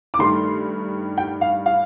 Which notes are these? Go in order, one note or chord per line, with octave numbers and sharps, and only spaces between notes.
D6
G2 D#3 A3 C6
G5
F5
F5